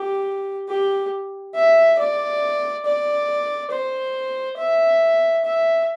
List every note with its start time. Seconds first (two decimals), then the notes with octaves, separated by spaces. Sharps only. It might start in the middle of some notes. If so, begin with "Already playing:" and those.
Already playing: G4
0.69 G4
1.55 E5
1.98 D5
2.86 D5
3.71 C5
4.58 E5
5.45 E5